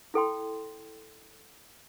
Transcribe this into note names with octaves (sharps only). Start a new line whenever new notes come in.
E4 A4 G5 C6